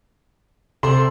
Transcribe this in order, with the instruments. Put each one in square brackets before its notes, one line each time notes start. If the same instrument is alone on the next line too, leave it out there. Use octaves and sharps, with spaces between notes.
[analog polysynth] C3 [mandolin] A4 C5 D5 [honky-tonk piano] C6